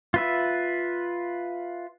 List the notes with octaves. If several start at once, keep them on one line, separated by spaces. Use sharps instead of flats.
F4 B4 E5